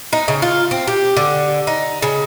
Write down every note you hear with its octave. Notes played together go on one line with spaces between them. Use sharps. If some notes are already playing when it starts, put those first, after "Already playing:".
D#4
C#3
F4
C4
G4
D3
D#4
C#3